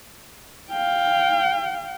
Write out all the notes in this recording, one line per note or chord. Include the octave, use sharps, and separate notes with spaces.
F5 G5